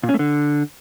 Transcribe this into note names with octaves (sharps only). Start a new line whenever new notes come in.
A#2
C#4
A3
D3